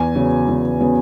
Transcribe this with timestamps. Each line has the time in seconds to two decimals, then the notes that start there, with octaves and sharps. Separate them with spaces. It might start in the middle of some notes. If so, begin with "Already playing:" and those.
Already playing: E2 G#5
0.15 C#3 F#3 B3
0.48 E2
0.80 C#3 F#3 B3